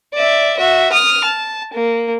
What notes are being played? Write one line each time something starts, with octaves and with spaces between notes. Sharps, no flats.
D5 E5
F#4 E5
D#6 F6
A5
A#3